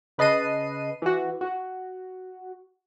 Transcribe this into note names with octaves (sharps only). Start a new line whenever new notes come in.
C#3 B4 D#5 A5 C7 D#7
E3 F#4
F#4